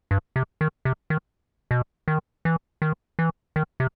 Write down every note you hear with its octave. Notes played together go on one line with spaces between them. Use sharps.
G2
C3
D#3
C3
D#3
B2
D#3
E3
D#3
E3
D#3
C3